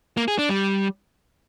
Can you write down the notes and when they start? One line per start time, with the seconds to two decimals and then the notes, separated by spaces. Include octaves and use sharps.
0.17 A#3
0.28 G#4
0.39 D4
0.49 G3